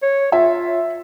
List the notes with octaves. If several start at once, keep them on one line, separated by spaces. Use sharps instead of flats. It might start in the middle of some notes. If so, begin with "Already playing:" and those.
C#5
F4 E5